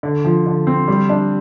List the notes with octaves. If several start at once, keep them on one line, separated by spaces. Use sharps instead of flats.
D3
F3
D3
C4
G3
D4